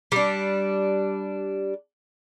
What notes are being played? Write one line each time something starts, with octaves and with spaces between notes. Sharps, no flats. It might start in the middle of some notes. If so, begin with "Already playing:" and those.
G3 D4